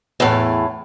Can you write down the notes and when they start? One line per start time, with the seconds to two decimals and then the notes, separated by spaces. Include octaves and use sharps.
0.20 E2 A2